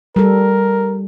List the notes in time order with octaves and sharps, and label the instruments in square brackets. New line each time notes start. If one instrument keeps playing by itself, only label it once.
[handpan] G3 A4 [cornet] A#4